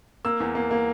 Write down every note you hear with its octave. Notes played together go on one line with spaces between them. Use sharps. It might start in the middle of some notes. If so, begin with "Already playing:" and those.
A#3 E6
E2
A#3
A#3